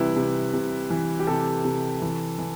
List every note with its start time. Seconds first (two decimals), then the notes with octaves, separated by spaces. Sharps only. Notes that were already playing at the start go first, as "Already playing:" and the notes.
Already playing: C3 E3 G3 E4 B4
0.16 C3
0.53 C3
0.90 E3
1.20 G4
1.27 C3 A4
1.65 C3
2.02 E3
2.39 E3